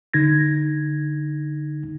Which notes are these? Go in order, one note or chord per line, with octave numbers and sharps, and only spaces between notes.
D3 D#4 G#6 A#6